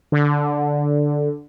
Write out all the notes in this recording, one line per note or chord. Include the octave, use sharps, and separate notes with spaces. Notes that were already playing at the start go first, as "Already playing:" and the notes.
D3